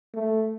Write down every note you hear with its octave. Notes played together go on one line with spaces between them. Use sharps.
A3